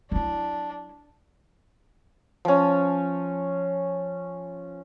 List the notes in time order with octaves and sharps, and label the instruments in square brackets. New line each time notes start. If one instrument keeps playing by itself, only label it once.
[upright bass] F#3 E4 [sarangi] D4
[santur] F3 C#4